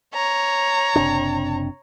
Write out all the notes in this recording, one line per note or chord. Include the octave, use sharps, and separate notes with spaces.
C#5 A#5
F#1 C3 D4